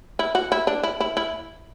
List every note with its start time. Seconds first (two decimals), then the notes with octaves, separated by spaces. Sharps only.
0.19 E4
0.35 F#4
0.52 E4
0.67 D4
0.83 E4
1.00 E4
1.17 E4